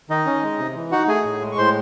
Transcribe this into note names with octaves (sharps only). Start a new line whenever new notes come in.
D#3 D#4 D#5
C#4
G#3
C3
E3
D#4 F#4 F#5
A3 G#4 G#5
A2
G#3
C#6
A2 C5 C6